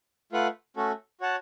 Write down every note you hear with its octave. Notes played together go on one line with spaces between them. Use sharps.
A3 F4 B4 F#5
A3 C#4 F#4 A4
F#4 C#5 F#5 A5